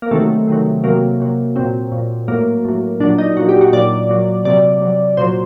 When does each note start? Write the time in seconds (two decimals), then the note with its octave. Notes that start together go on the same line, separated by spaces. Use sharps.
0.02 A#3
0.11 C3 D#3 F#3 A3
0.48 C3 D#3 F#3
0.84 C3 F#3 A#3
1.20 C3 F#3
1.56 A#2 F#3 C4
1.92 A#2 F#3
2.28 A2 F#3 A#3
2.65 A2 F#3
3.00 A#2 F#3 D4
3.18 D#4
3.37 A#2 F#3 F#4
3.49 G4
3.61 F#4
3.73 A#2 F#3 D5
4.09 A#2 F#3
4.45 C3 F#3 D5
4.81 C3 F#3
5.17 A#2 F#3 C5